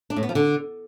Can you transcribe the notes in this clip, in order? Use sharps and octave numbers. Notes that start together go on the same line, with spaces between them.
D4
A2
B3
F3
D3